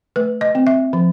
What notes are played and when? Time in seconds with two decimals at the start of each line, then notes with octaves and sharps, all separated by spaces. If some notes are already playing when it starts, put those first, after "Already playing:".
0.16 A3 B4
0.41 D#5
0.55 C4
0.67 E5
0.93 F3